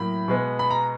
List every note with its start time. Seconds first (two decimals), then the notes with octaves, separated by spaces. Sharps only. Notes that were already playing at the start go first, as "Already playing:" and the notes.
Already playing: A2 F#3 A#3 B5
0.28 B2 G#3 B3
0.59 B5
0.70 A#5